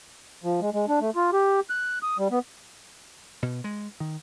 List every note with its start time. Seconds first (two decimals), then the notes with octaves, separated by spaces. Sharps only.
0.44 F3
0.61 G#3
0.73 G#3
0.89 D4
1.01 A3
1.16 F4
1.33 G4
1.70 F#6
2.03 D#6
2.18 G3
2.31 B3
3.42 B2
3.64 G#3
4.00 D#3